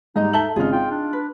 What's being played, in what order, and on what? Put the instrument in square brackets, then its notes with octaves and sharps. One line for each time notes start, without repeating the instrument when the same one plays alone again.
[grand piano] G#2 G3 [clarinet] D#4 [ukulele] G#4 D#5 A#5
[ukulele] A4 E5 A5 [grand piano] F#7 G7
[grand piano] G#1 C#3 F6 [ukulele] D#4 G#4 [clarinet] F4
[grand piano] F4 [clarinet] G5
[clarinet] D4
[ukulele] B4